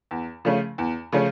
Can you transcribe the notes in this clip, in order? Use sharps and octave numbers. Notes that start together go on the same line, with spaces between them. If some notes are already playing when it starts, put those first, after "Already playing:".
E2
C#3 F3 A3 C#4
E2
C#3 F3 A3 C#4